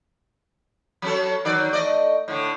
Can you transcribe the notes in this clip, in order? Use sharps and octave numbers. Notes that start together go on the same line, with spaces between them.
F#3 C#4 A4
D#3 F#3 D5
A3 D5 D#5
A2 D3